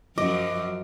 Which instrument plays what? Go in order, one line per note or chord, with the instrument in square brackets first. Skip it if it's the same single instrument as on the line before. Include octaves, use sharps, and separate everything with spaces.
[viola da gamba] F#2 F3 F#3 [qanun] D#5 [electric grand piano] D6